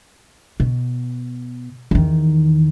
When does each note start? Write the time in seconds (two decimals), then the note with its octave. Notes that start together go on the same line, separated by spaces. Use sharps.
0.60 B2
1.91 E2 D#3